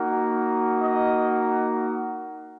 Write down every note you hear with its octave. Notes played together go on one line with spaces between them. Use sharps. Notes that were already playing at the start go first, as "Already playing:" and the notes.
Already playing: A#3 D#4 F#4
D#5